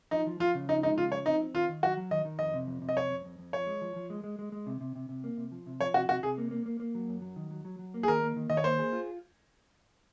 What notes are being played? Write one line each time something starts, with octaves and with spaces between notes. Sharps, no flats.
F3 D#4
F3
F3 F4
C#3
F3 D#4
G#3 D#4
C#3 F4
F3 C#5
C4 D#4
C4
D#3 F4
D#3
F#3 F#4
F#3
D#3 D#5
D#3
F2 D#5
C3
F2
C3
D#5
F2 C#5
F2
F2
F2
F3 C#5
G#3
F3
F3
G#3
G#3
G#3
G#3
C3
C3
C3
C3
A#3
C3
F3
C3
F3 C#5
C3 F#4
C3 F#4
C3 G#4
A#3
A#3
A#3
A#3
F#3
F#2
F#3
D#3
F#3
F#3
F#3
A#3
G#4
D#3 A#4
A#3
D#3
D#3 D#5
C#5
A#3 C5
G#4
F4